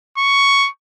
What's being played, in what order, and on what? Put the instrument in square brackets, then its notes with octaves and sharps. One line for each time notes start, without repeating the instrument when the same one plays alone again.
[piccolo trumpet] C#6